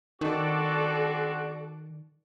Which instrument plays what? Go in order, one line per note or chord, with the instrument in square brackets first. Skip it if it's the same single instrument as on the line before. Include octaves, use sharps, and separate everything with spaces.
[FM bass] D#3 [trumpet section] C4 D4 F#4 [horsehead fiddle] A4 D5